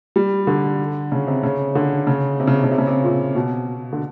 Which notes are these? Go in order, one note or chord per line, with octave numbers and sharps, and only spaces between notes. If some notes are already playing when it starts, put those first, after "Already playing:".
G3
D3
C#3
C3
C#3
D3
C#3
C3
C#3
C3
C#3
C3
C#3
C3
A#2
B2
D3